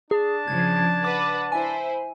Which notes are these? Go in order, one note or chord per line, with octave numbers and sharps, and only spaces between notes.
D4 G#4 A5
C#3 F3 G#6
B4 F#5 D6
E4 C5 G#5